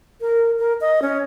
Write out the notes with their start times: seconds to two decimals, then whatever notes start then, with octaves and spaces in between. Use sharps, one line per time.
0.21 A#4
0.59 A#4
0.81 D#5
1.02 C#4